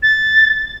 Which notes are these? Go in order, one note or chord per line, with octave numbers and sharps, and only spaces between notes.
A6